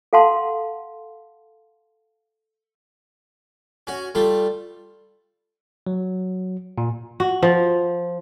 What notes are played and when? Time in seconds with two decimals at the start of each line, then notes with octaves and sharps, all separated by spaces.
0.13 A4 F5 F#5 A5 C6
3.87 C#4 F#4
4.15 G3 A3 F4
5.87 F#3
6.78 A#2
7.20 F#4
7.43 F3